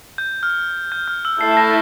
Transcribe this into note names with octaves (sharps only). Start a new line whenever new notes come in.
G6
F6
G6
F6
E6
A3 E4 A4 E5 A5 C7
A#6